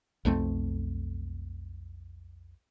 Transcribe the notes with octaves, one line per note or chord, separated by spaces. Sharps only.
B1 F2 A3 C4